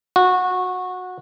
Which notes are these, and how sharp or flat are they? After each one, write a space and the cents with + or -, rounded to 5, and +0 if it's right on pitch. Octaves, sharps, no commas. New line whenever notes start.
F#4 -20